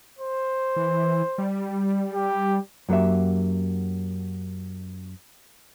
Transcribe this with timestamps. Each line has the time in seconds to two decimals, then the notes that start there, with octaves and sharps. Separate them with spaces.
0.19 C5
0.76 E3
1.38 G3
2.13 G4
2.89 F#2 F#3 A#3 G4 E5